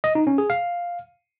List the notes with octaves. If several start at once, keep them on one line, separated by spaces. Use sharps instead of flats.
D#5
D#4
C#4
G#4
F5